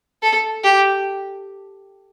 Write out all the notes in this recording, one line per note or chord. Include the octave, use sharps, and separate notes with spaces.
A4
G4